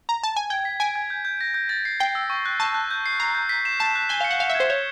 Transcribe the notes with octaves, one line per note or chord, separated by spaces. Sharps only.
A#5
A5
G#5
G5 G#6
B6
G#5 D7
G#6
G6
G6
A#6
G6
A6
C7
G5 C7
E6
C#6
F#6
A5 C#6
F#6
G6
C7
A#5 C7
G6
B6
E7
A5 E7
F#6
G#5 G7
F5 C#7
F#5
F5 C#7
E5
G#6
C5
C#5 G6